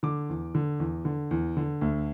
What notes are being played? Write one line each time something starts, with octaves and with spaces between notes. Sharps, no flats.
D3 D6
E2
D3
E2
D3
E2
D3
D2